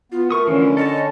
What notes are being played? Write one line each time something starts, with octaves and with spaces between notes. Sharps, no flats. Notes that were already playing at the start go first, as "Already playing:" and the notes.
B3 F4
A3 A#4 C#6 D#6
D3 E3 F3 A3 C#4
A4 C#5 D#5 A5